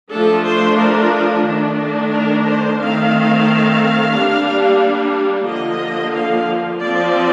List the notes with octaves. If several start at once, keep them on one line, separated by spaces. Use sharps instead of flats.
F3 A3 D4 A4
C5
A#4
D#3 A3 D4
A#4
C5
D#3 A3 C4 F5
G3 A#3 D4
D3 F3 A#3 D#5
F5
F3 C4 D5